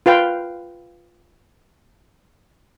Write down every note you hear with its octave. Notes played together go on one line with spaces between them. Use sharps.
F4 B4 F5 G5